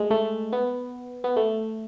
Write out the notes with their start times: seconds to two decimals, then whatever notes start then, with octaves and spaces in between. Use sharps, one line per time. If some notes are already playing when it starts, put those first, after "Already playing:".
Already playing: G#3 A3
0.11 A3
0.53 B3
1.24 B3
1.36 A3